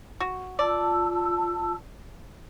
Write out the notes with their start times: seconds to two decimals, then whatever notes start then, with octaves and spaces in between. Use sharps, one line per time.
0.20 F#4
0.59 F4 D5 A5 E6